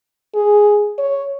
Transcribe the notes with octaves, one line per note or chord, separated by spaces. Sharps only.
G#4
C#5